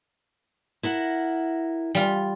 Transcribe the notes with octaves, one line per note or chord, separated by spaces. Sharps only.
E4 A#4 F#5
G3 F4